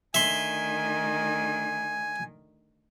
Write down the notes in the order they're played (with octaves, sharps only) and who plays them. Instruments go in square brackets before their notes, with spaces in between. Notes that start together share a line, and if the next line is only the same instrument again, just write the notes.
[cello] D2 D#3 [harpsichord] E5 C6 [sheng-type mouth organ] G#5